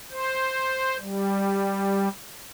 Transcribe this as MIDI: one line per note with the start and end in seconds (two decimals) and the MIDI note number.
0.11 0.97 72
0.99 2.08 55